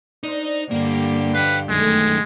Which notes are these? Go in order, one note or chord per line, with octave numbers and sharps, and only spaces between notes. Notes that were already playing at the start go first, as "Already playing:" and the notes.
D4 D#4 C5
G2 D3 A#3 G4
B4 F5 G5
F#2 D#3 G#3 A3 A4